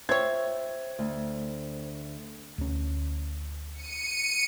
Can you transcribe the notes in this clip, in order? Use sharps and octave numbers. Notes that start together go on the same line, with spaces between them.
F4 C5 C#5 E5 G5 G#6
D2
D2 C#4
C#7 D#7